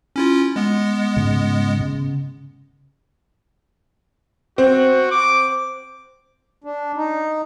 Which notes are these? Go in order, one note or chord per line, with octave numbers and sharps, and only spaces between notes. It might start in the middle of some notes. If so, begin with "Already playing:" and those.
C#4 E4 F4
G#3 B3
G#2 C#3
C#3
C4 F#4
D6
D4
D#4